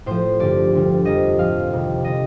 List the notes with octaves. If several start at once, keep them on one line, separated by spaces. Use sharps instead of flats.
A2 F3 C5
G2 D3 F3 D5
D2 D3 G3
F2 D3 G3 D#5
A2 F3 F5
F2 C3 D#3 G3
D3 G3 D#5